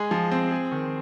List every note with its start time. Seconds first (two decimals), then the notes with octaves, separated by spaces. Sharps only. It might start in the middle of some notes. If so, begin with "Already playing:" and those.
Already playing: G#3 G#4
0.11 F3
0.31 C4
0.52 G#4
0.72 D#3